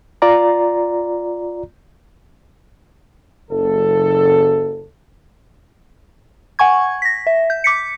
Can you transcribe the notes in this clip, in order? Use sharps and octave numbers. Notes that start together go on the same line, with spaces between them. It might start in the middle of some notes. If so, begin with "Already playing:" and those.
F4 D5 A#5
F#1 A4
F#5 G#5 C#6 G#6
A#6 B6
E5
G6
D6 B6 C#7